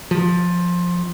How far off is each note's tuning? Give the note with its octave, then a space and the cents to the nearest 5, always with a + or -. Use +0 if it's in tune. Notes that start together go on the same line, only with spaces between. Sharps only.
F3 +15